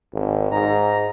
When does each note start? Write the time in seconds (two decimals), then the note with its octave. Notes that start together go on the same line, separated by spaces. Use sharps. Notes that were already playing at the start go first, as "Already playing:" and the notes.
0.13 G#1
0.51 G#2 A#5